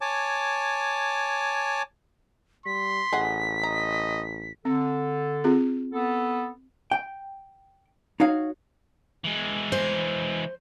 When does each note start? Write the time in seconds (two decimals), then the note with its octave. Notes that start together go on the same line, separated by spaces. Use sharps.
0.01 C#5 G#5 A5 D6
2.66 G3 C6 B6
3.13 A1 G#4 D#5 F#5
3.63 D#5 A#5
4.65 D3 C4 A4
5.44 C4 F4 G#4
5.92 B3 A4
6.91 G5
8.20 D#4 F#4 C#5 F5
9.24 E3 G#3
9.72 C5